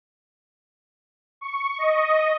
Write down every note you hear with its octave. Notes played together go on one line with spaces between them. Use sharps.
C#6
D#5